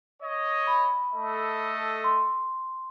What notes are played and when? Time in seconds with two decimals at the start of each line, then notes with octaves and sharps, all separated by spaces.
0.21 C#5 D#5
0.67 B5
1.13 A3 A4 D#5
2.04 C6